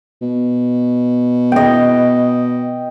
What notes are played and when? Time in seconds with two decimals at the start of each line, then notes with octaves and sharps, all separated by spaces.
0.22 B2
1.52 D#5 G5